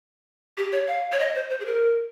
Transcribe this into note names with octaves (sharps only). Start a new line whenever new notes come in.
G4
C#5
F5
C#5
D#5
C5
C5
G#4
A#4